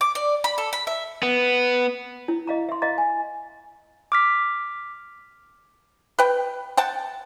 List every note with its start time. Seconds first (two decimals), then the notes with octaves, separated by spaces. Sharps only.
0.01 D6
0.15 D5
0.44 B5
0.58 A4
0.73 B5
0.87 E5
1.23 B3
2.28 E4
2.47 D#5 F5 A#5
2.69 E5 C6
2.82 D#5 F5 A#5 A6
2.98 G#5
4.12 D6 F6 B6
6.19 B4 G5
6.77 F#5 G5 A5